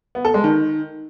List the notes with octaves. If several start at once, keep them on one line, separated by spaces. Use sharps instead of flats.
B3
A4
G#3
D#3